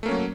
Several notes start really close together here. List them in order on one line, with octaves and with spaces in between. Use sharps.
A3 A#3 C#4 F#3